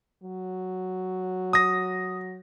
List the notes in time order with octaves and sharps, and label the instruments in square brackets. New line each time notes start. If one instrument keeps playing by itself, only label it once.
[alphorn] F#3
[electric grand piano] D#6 A#6